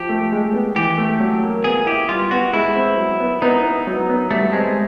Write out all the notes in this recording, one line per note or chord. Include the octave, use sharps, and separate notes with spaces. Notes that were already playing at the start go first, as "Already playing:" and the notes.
Already playing: F3 G4
A3
G#3
B3
E3 G4
A3
F#3
A#3
B3 G#4
E4 G4
G3 F4
B3 F#4
G#3 E4
C4
F#3
B3
B3 D#4
E4
F#3
B3
G3 A3
G#3 C4